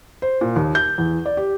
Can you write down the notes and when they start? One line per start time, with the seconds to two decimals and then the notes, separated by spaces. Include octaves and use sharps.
0.22 C5
0.41 A#2
0.56 D#2
0.75 G6
0.98 E2
1.26 D5
1.37 G4